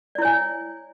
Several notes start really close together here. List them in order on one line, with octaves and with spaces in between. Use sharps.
D5 E4 C#5 G#5